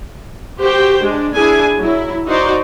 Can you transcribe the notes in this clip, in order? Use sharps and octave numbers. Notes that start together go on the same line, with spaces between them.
F#4 G4 C5 G5
G#3 D4
D4 E4 G#4 G#5
F#3 E4
D#4 F#4 C5 D5